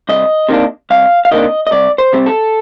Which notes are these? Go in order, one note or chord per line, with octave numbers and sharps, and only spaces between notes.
C2 D#5
C3 D#3 A#3 D4
C2 F5
F5
C3 D#3 A#3 D4 D#5
D#5
C2 D5
C5
C3 G3 C4
A4